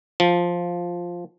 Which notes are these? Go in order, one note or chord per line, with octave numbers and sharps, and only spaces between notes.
F3